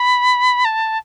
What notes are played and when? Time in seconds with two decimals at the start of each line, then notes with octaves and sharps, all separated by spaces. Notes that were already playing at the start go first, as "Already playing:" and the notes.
Already playing: B5
0.65 A5